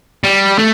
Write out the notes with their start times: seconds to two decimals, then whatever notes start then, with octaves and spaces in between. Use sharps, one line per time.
0.24 G3
0.58 A3